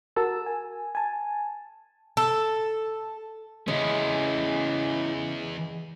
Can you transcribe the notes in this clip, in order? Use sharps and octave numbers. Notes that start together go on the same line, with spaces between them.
F#4 A#4 A5 E6
G#5
G#5 A5
A4
E2 C#3 G#3 C#4 E4